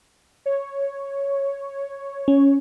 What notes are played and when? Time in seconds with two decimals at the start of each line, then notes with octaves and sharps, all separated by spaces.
0.46 C#5
2.28 C#4